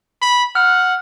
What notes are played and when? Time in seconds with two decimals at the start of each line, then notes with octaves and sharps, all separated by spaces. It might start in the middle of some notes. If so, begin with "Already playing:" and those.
0.22 B5
0.55 F#5 F6